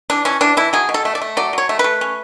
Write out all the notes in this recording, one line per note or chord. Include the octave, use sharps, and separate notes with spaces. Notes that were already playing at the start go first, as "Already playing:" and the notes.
E3 D4
E3 C#4
E3 D4
E3 E4
F#3 G#4
B2
A4
A3
D5
A3
F#3 D5
F#3 C#5
A3
A3 B4
C#4